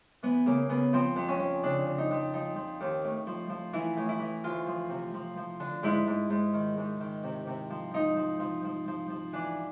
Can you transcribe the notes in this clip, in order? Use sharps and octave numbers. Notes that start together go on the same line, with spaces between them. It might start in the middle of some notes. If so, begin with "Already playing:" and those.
E3 B3
C#3 A#3
C#3 B3
F3 C4
F2
C#4
F2
C#3 D4
C#3
D#4
F2
F3 D#4
F3
D#2
A2
F3
F3
E3 E4
A2
E4
E3
D2 F4
F3
C3
F3
F3
D3
G#2 E4
G#2
G#2
D#3
G#2
D#3
C3
C3
F3
F3 D#4
F3
F3
F3
F3
F3
E3 D4